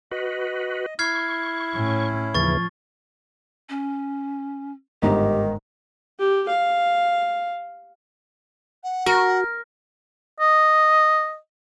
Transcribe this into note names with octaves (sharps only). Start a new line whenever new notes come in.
F#4 B4 D#5
E4 C#6 F6 G#6 C7
A2 C#4
D#2 C#3 E3 F3 C#6 A6
C#4
G1 G#2 D#3 G4 A#5
G4
F5
F#5
F#4 A#4
D#5